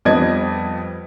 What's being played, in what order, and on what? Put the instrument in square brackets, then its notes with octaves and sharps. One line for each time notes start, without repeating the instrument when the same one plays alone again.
[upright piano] F2 G3 B3 D4 D#5 G#6